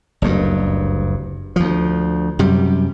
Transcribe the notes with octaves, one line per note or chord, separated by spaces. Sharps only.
F#1 D2 G2
D2 F3
F#2 C3 G3